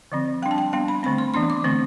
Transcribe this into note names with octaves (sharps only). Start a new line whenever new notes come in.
D3 F3 C4
G3 D4 G5
A5
G5
G3 B3 D4 G5
B5
D3 A3 C4 B5
C6
E3 B3 D4 C6
D6
D3 A3 C4